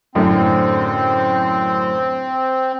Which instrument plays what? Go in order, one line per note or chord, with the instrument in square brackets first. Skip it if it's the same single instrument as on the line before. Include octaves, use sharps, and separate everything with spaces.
[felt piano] F#2 A2 D3 [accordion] C4